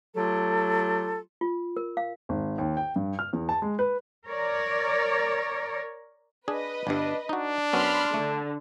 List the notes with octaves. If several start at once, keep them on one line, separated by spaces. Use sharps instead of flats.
F#3 A3 F4 G4 A4
F4
A#4
F5
G#1
D#2
G5
G2
F6
E2
A5
G#3
B4
A#4 C#5 D5
D4 G#4 B4 D#5
G1 G2 D4
D4 D#4 F#4
F#2 B3 C#4 B5 C6 F6
D3 A3